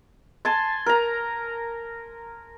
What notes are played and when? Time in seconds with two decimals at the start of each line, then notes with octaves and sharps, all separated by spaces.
0.45 G#5 A5 C6
0.86 A#4 A#5